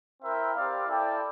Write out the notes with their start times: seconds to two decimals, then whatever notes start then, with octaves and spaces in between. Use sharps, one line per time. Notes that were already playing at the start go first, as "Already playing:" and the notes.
0.21 C4 E4 A#4 E5 G5
0.54 C4 G4 D5 F5
0.87 E4 A4 D5 G5